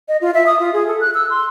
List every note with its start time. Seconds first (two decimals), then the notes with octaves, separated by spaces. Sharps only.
0.08 D#5
0.21 F4
0.34 E5
0.46 D#6
0.60 F4
0.73 G#4
0.87 A4
1.01 F#6
1.14 E6
1.30 C6